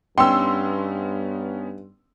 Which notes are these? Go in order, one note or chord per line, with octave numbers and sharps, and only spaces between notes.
G2 B3 C#4 D#4 G5 C6 E6